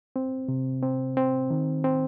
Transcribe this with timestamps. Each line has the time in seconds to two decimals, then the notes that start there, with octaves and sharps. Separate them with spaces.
0.16 C4
0.48 C3
0.83 C4
1.17 C4
1.50 D#3
1.84 C4